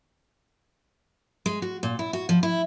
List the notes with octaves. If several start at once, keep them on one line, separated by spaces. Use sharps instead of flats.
G#3
F#4
A#2
E4
F#4
F3
E4